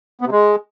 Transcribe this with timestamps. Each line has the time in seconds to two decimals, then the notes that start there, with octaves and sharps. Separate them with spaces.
0.21 B3
0.26 C3
0.32 G#3